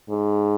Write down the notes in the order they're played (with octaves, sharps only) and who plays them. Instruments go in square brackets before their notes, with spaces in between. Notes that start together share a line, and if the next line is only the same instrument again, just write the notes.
[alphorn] G#2